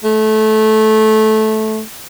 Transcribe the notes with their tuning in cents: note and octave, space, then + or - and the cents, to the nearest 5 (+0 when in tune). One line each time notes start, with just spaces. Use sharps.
A3 -15